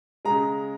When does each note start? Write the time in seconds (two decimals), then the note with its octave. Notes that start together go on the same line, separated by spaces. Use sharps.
0.25 C#3 G#3 A#5